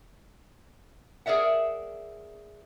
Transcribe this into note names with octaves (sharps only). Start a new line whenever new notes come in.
G#4 A#4 D5 E5 F#5